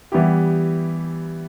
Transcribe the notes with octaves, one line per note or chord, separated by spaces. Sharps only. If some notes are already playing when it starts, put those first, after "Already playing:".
E3 G3 B3 E4 G4